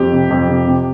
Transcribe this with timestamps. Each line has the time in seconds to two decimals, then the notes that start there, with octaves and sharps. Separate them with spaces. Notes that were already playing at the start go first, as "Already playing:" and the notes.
Already playing: F2 G4
0.12 C3
0.30 F2
0.48 C3
0.67 C3